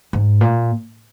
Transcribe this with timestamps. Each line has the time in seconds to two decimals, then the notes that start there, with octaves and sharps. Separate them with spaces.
0.13 G#2
0.41 A#2